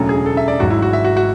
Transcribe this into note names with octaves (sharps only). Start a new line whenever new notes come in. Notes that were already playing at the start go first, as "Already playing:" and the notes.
Already playing: E1 D2 C#3 F#3 A4
G#4
A4
E5
D5
G#1 G#2 F#3 F#4
E4
F#4
E5
F#4
F#4